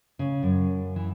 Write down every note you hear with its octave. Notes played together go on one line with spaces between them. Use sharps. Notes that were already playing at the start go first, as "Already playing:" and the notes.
C#3
F#2
E3